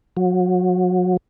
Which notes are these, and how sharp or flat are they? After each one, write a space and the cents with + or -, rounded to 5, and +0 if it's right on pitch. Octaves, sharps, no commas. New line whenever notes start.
F#3 -30